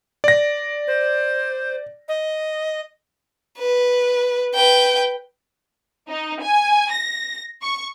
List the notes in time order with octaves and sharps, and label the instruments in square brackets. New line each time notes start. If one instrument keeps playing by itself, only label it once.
[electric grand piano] D5 A#6
[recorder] C5
D#5
[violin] B4
B4 G5
[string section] D#4
G#5
A#6
C#6